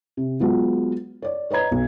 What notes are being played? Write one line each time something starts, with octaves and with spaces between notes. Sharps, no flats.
C3
F#3 G#3 B3 F4
C#5 D5
B4 C#5 D#5 A#5 G#6
B1